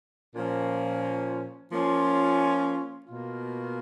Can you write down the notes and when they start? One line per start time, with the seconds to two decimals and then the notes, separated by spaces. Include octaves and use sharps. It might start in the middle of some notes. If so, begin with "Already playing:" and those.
0.36 A#2 F3 A#3 C#4 F4
1.71 F3 A#3 C#4 F4
3.06 B2 A#3 F4